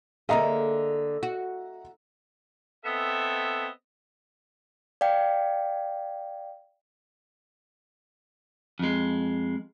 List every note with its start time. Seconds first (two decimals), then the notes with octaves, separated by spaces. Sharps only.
0.29 D3 A#3 G#4 D#5 E5 A#5
1.23 F#4
2.85 B3 C4 A4 D#5 E5
5.01 D5 F5 G5
8.79 F2 G#3